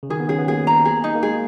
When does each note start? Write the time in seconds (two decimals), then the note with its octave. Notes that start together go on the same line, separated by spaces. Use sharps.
0.03 C#3
0.10 D#3 G#4
0.20 B3
0.29 C#4 G#4
0.38 B3
0.48 A#3 G#4
0.67 A#5
0.85 G#4
1.04 D#4
1.15 A#3
1.23 G#3 G#4